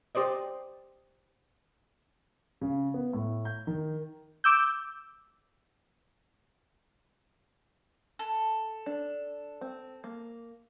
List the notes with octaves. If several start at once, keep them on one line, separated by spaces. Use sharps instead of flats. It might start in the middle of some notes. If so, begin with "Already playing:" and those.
G4 C5 D5 D#5
C#3
B3
A2
G6
D#3
D6 E6 G6
A4
D4
C4
A#3